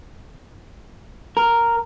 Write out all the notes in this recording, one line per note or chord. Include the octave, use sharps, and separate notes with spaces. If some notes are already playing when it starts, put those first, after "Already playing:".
A#4